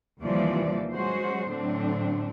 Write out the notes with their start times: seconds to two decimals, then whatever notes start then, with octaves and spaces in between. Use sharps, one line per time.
0.21 D#2 C3 E3 F3 G3 D5
0.92 F#3 G#3 C#4 F#4 C5
1.49 A2 D3 F#3 C4 D4